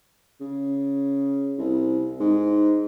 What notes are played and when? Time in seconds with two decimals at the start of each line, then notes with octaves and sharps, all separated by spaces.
0.40 C#3
1.58 C2
2.20 G#2